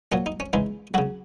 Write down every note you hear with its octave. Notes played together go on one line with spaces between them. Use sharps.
A#2 F#3 C#4
D#4
C#4
C#3 E3 G#3 D#4
C#3 F#3 F#4